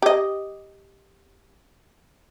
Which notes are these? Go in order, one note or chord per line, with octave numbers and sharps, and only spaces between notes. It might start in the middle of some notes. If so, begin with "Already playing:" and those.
G4 D#5